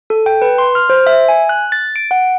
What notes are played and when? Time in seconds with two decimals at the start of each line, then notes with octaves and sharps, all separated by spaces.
0.10 A4
0.26 G5
0.42 B4
0.58 C6
0.75 F6
0.90 C5
1.07 E5
1.28 G#5
1.49 F#6
1.72 A6
1.96 D7
2.11 F#5